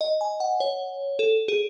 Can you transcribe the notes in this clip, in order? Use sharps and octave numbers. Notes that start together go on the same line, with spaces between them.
D#5
G#5
F#5
C#5
A4
G#4